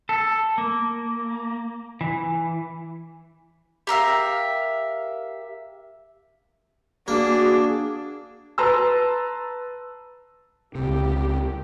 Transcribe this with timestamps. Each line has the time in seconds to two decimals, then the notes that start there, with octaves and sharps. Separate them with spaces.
0.09 A4
0.58 A#3
2.01 E3
3.87 G4 A#4 E5 F5
7.08 A#3 D4 F#4 G#4
8.58 B4 A5 A#5 C6 E6
10.75 C#2 C3 G4